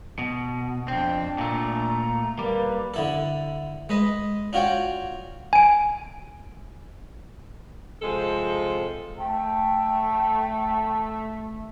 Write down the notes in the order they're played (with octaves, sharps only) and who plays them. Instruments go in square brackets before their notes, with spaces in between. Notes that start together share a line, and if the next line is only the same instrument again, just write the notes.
[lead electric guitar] B2
[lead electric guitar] F2 C4 [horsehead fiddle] D4 [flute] G5
[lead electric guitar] A#2 A3 [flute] A#5
[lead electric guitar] G3 [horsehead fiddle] A#3 B4
[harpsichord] D3 E4 A4
G#3 B4 D#5
D4 F4 F#4 C#5 G5
[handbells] G#5 D7
[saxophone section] C3 F3 G#3 A4
[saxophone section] A3 [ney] G5 [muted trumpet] A5